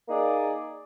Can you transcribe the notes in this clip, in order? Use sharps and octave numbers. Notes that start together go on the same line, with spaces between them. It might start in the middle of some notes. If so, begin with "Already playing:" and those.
A#3 D#4 G#4 D5